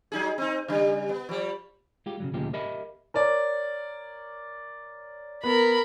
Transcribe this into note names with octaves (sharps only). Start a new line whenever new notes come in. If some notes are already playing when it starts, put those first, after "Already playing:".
F#3 D#4 G#4
C4 D#4
C#3 G3
B3
F3 G3
G#3 F4 G4
C#3 E3 F#3
D2 A#2 C#3 F3 G#3 G4
G4 A#4 D#5 E5 B5
A#4 C#5 D5
B3 A#4 B5